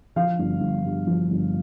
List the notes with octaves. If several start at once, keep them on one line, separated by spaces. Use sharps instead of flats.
F3 F5
G1
G1
G2
F3
G1